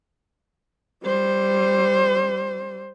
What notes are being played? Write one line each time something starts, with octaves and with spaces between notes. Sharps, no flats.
G3 C5